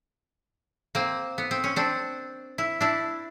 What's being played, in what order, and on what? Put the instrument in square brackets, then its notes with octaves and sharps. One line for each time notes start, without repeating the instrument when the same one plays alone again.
[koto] A#3 C4
B3
C4
C#4
C4 D4
E4
D4 E4